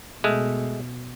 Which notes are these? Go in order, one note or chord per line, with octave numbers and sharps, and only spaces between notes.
B2 G#3 A3